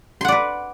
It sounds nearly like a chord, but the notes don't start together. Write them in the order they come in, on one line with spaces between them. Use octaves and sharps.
C6 F#5 D5 B4